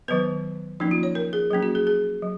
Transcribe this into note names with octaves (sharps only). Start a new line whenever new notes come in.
D#3 F#3 B3 B4
F3 A#3 C#4 D#4
F4
C#5
A#4
G#4
F#3 A#3 C#4 G#4
F#4
G#4
G#4
F#3